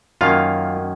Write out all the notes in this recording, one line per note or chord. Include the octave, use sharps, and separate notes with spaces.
F#2 D#3 A#3 C#4 F4 F5